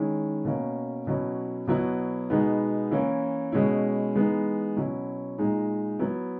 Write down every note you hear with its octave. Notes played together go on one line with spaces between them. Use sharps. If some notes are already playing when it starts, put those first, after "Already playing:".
Already playing: D#3 G#3 C#4 E4
B2 A#3 C#4
B2 F#3 C#4 E4
B2 F#3 B3 E4
B2 G#3 B3 D#4
E3 A#3 C#4 E4
B2 G#3 C#4 E4
E3 G#3 B3 D#4
B2 F#3 C#4 E4
A#2 G#3 D#4
F#3 B3 E4